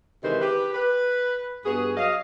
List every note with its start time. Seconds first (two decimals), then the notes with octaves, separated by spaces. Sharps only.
0.24 C3 D#3 E3 G#3 B4 C5
0.42 G4 B4
0.75 B4
1.65 G2 B3 F#4 G#4
1.96 F#3 D#5 F5